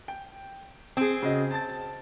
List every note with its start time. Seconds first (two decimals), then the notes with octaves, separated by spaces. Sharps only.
0.08 G5
0.97 C4 G#4
1.22 C#3 F#4 D#5
1.51 A5 A6